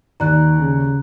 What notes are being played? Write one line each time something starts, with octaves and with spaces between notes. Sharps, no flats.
D#2 D#3 D5 A#5 F#6
C#3